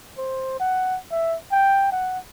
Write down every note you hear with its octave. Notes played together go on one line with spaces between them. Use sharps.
C5
F#5
E5
G5
F#5